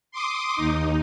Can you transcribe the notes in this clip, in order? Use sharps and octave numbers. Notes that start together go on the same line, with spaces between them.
C6 D6 D#6
D#2 D#4